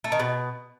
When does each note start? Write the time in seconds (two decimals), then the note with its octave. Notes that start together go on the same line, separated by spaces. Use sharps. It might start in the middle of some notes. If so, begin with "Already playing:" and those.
0.04 A3
0.12 D#3
0.20 B2